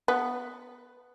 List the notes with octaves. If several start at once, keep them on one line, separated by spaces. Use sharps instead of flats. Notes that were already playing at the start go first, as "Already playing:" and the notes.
B3